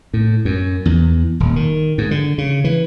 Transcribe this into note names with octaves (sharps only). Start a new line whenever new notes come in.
A2
F#2
E2
D#1
D#3
G#2
D3
C#3
E3